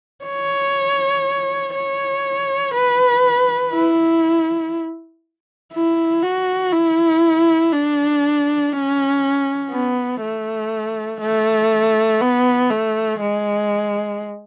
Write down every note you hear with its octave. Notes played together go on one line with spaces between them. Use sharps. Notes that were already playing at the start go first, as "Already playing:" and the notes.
C#5
C#5
B4
E4
E4
F#4
E4
D4
C#4
B3
A3
A3
B3
A3
G#3